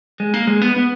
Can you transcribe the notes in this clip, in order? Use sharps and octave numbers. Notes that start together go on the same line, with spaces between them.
G#3
A#3
G#3
B3
B3